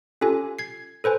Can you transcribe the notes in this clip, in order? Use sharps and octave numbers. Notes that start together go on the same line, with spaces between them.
C#4 F4 G4 A4 G#5
G#6 C7
A4 B4 C5 G#5